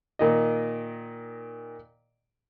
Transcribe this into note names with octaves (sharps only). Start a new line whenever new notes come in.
A#2 D#3 D#5